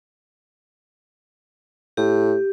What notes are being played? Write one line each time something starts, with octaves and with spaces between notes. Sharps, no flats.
A2 G4